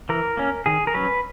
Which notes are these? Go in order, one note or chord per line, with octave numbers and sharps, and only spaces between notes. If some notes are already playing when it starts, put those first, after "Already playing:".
E3 A#4
A#3 C#4
D#3 G#4
A#4
F#3 C#4 B4